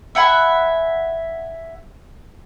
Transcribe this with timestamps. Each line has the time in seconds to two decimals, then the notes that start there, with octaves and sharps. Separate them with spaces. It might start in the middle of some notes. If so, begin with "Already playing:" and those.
0.15 E5 F#5 G#5 B5